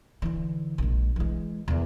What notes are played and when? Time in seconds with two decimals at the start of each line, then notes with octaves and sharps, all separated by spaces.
0.22 D3 E3
0.78 A#1 G#3
1.16 E3 G#3
1.68 E2 D#3